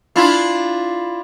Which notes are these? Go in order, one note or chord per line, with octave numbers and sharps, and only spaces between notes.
D4 E4 F4